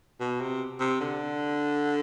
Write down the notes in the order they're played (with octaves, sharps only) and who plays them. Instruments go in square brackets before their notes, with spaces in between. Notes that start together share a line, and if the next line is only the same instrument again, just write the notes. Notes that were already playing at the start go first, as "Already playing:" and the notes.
[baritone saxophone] B2
C3
C3
D3